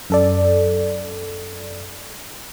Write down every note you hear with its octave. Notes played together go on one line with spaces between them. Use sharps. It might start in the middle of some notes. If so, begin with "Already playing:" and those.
F#2 A4 D5